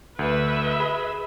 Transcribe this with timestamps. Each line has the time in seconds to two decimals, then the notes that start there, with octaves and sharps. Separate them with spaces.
0.19 D2 B4 E5
0.80 G#4 B5